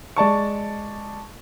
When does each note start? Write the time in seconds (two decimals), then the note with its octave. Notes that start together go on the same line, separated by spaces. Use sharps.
0.16 G#3 D5 A5 C#6